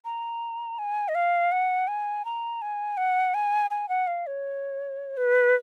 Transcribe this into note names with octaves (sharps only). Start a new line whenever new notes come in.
A#5
G#5
D#5
F5
F#5
G#5
A#5
G#5
F#5
G#5
G#5
F#5
F5
C#5
B4